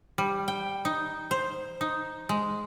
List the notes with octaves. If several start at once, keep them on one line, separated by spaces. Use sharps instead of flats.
G3
G5
D#4
C5
D#4
G#3